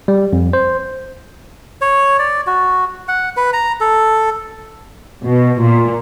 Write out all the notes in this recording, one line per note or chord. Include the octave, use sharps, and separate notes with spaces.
G3
F2
C5
C#5
D5
F#4
F#5
B4
A#5
A4
B2
A#2